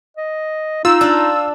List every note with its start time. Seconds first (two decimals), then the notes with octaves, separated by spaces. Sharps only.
0.17 D#5
0.85 D#4 F4 E6
1.01 D4 F5